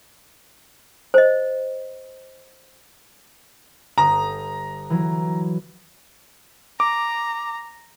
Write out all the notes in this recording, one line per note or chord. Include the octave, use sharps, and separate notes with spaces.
C5 D#5
G1 A#5 D#6
E3 F#3
A#5 D6